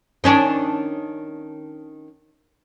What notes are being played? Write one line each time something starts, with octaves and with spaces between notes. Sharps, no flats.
D#3 C#4 D4